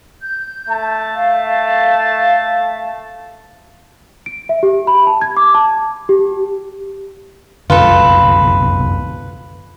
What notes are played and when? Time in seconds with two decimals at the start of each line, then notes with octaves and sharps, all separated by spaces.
0.22 G6
0.69 A3 A5
1.11 F5
4.26 D7
4.49 E5
4.63 G4
4.87 B5
5.07 A5
5.21 G#6
5.37 D6
5.54 A5
6.09 G4
7.70 F1 C2 F#2 D3 F4 A4 B4